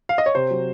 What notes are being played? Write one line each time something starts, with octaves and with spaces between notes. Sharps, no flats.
F5
D#5
C#5
C3 C5
F#3